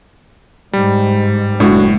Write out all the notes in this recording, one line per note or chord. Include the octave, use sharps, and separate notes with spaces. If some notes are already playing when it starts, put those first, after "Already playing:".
G#2 G3
F#1 A2 G#3 D4 F#4